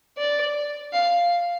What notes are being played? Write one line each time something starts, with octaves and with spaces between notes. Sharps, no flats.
D5
F5